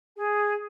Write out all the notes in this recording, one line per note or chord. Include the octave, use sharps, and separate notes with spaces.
G#4